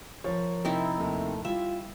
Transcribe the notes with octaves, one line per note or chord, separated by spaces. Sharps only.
F3 A#4 C#5
C3 C4 D#4 E4
D#2 C3 D#3 A3
G3 E4 F4 E5